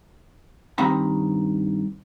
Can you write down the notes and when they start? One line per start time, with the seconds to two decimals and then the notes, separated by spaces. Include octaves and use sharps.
0.78 G2 D#3 C4 A#5 B5